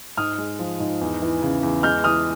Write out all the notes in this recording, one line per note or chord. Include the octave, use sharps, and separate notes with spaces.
G#2 D#6 F6
G#3
F3
G#2
E2
E3
C#3
E2
G#3 F6 G6
E3 D#6 F6